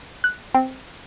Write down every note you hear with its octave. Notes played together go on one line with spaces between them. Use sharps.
F#6
C4